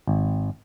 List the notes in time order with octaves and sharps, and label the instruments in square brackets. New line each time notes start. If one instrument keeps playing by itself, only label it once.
[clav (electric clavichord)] G#1